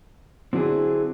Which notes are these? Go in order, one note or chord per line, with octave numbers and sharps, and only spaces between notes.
D3 F#3 C4 E4 G#4